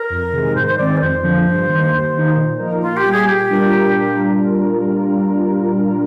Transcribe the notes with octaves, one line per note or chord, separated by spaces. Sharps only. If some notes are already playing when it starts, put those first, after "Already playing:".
Already playing: A#4
F2
C3 D#3 G#3
G#2 C5
C5
D#3 G#3 C4 D5
A#4
F2 C5
D3 F3 A#3
G2
D#3 A#3
D#2
D#3 A#3 D#4
A#2
F3 A#3 D#4 A#4
A#2 F4
G4
G3 A#3
G#4
A#2 G4
G3 D4 F4 A#4